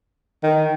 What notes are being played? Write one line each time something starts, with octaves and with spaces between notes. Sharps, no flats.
D#3